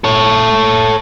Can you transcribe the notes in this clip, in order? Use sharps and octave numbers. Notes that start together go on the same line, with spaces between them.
A4 C#5